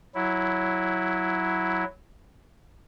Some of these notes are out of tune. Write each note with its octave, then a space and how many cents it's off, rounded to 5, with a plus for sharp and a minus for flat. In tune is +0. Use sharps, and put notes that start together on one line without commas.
F#3 +0 E4 +0